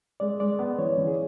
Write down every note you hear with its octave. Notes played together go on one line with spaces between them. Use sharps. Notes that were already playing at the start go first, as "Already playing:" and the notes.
G#3 D5
G#3 D5
B3
E3 C#5
E3
G#4